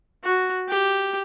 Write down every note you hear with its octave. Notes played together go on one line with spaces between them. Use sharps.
F#4
G4